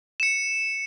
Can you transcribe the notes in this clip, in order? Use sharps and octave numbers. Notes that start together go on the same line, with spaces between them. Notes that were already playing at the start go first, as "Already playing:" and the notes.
C#7 E7